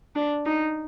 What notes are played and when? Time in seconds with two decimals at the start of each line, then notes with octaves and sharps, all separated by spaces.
0.16 D4
0.46 D#4